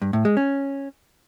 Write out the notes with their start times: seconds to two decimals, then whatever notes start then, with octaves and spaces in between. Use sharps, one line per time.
0.02 G2
0.13 A2
0.25 G#3
0.37 C#4